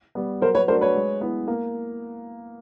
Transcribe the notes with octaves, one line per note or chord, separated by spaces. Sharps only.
G3 B3
F#3 A#4 C5
B4 C#5
A3 D4 F#4 A4 A#4 C5
B4 C#5
G#3
B3 E4
A#3